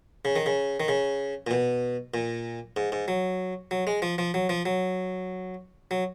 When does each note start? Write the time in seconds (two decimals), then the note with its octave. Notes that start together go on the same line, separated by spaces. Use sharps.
0.25 C#3
0.36 D#3
0.46 C#3
0.80 D#3
0.88 C#3
1.47 A#2
1.51 B2
2.14 A#2
2.76 G#2
2.92 G#2
3.08 F#3
3.71 F#3
3.87 G#3
4.02 F3
4.18 F3
4.34 F#3
4.49 F3
4.66 F#3
5.91 F#3